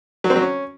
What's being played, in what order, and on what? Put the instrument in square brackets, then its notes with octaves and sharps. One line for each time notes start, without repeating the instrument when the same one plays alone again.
[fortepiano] F#3
C4
F#3
C#4